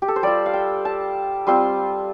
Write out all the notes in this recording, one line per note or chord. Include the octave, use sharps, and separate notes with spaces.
G4
A4
C5
G3 F4 D5
F5
G5
A5
G3 C4 F4 C6